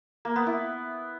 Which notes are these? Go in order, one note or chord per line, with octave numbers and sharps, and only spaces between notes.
A#3
B3
E4